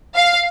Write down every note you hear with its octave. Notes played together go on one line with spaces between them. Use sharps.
F5